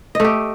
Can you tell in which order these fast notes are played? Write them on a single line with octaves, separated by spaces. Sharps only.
D#5 A3 G4